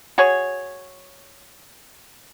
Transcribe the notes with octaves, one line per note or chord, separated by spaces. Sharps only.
F#4 G#4 C#5